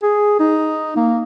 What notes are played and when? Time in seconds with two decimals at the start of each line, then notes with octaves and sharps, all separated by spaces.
0.03 G#4
0.40 D#4
0.96 A#3